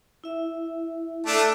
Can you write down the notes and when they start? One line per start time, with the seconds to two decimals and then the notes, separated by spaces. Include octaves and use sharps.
0.24 E4 E5
1.27 A3 D4